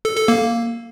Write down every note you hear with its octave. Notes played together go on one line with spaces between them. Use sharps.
A4
A4
A#3